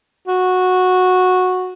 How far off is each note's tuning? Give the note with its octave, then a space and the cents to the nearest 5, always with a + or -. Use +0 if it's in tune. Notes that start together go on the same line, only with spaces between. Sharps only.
F#4 -10